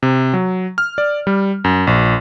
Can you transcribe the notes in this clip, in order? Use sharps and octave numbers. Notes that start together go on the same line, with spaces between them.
C3
F#3
F6
D5
G3
F#2
A#1